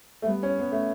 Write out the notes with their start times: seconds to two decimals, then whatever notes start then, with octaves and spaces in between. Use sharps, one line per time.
0.22 A3
0.27 G3 B3
0.43 C#4
0.59 B3
0.72 A3